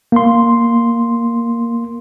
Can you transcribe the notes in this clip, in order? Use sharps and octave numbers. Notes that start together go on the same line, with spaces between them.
A#3 C6